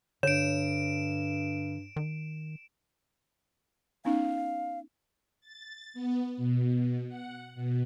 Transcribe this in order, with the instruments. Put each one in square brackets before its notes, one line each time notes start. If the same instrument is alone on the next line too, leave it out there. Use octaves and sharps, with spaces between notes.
[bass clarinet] G2 [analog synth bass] D3 [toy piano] C#5 [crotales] D7 E7
[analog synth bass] D#3
[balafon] B3 C#4 D#4 [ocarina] F5
[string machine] A6
B3
B2
F#5
B2